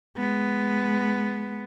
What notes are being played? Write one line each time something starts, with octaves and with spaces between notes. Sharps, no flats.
G#3 B3